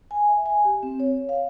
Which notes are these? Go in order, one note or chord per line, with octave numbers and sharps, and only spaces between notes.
G#5
E5
G#5
G4
C4
C#5
F5